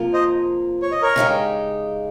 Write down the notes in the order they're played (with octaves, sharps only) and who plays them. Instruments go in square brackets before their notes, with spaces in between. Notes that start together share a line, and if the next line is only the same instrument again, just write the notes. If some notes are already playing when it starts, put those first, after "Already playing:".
Already playing: [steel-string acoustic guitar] C3 F3 A#3 F4
[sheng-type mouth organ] C5 D#5
C#5
D#5
A#4 C#5
[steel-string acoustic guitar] C#3 G#3 D#4 G4